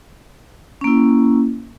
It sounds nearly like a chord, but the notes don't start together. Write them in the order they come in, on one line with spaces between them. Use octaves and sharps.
C#4 A#3 E4